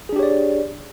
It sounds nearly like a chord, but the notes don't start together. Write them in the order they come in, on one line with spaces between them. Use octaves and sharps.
G#4 D4 G4 C#5 D5